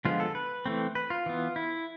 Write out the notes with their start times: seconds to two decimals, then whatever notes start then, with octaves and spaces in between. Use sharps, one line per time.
0.05 D3 F3 G#3 B3 F4
0.20 A4
0.35 B4
0.66 E3 A3 C4
0.95 B4
1.10 F4
1.26 E3 B3
1.56 E4